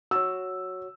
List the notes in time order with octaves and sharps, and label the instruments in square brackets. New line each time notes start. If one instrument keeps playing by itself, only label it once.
[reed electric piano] F#4 C#5 [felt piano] E6